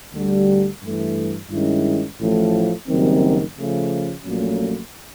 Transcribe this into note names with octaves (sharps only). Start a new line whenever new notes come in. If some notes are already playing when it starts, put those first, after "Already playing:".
D2 D3 G3
G2 E3 A3
G2 D#3 G#3 C#4 E4
A1 A2 F3
F#1 F#2 D#3 G3 C4
C#3 F3 A3
A#1 A#2 F#3 A3 C#4